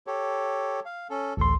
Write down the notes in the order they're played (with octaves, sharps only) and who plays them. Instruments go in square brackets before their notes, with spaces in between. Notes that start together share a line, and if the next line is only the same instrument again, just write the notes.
[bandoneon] G4 A4 C#5
F5
C#4 A4
[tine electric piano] A1 D2 C6 [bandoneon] A4